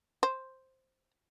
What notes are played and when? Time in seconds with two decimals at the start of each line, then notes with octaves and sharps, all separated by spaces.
0.23 C5